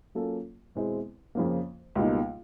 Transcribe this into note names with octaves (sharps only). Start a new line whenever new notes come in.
F#3 A#3 C#4 F4 A4
E2 B2 G#3 C4 E4
F2 C#3 F3 A#3
C#2 B2 G3 A#3 D#4